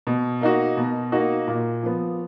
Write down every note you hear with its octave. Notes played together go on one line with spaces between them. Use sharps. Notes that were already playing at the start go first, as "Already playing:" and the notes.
B2
A#3 D#4 F#4
B2
A#3 D#4 F#4
A#2
F3 B3